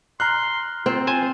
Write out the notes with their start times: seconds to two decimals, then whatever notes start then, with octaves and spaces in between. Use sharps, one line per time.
0.20 A#5 C6 F6 F#6
0.86 C4 F4
1.07 F4 C5 G#5